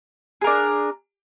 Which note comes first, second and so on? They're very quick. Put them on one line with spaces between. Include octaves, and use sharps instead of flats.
G#4 A#4 D4